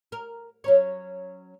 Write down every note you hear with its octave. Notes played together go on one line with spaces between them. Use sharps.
A#4
F#3 C#4 C#5